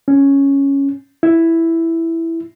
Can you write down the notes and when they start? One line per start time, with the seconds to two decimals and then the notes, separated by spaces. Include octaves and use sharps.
0.08 C#4
1.23 E4